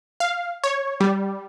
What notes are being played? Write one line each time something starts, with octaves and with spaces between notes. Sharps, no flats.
F5
C#5
G3